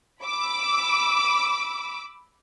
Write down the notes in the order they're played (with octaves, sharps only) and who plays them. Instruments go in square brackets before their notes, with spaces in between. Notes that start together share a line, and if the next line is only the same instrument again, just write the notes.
[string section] B5 D6 E6